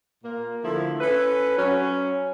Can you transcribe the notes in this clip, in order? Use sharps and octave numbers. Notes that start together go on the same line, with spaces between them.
A#2 A#3
D3 F3 A3 E4
C#4 A4 B4
F#3 C#4